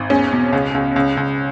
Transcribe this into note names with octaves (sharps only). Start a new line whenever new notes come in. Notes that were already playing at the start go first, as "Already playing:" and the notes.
Already playing: G#1
E2 C#4
B2
C#2
C#2
C#2
C#2